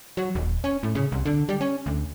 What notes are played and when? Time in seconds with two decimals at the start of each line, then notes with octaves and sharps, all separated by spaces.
0.17 F#3
0.35 D#1
0.64 C#4
0.83 A2
0.95 C#3
1.12 C2
1.26 D3
1.49 G3
1.61 C#4
1.86 D2